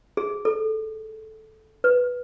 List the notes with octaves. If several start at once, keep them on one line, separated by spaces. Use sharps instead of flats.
G#4
A4
B4